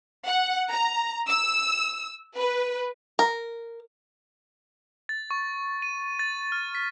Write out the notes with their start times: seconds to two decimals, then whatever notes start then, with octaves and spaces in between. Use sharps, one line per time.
0.27 F#5
0.71 A#5
1.29 E6
2.38 B4
3.19 A#4
5.09 A6
5.31 C#6
5.82 D#7
6.19 A6
6.52 F6
6.75 B6